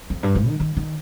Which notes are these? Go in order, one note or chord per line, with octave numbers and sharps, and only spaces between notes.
F2
G2
G#2
D#3
D#3
D#3